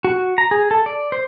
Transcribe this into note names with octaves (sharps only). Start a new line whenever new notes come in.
F#4
A#5
G#4
A4
D5
C5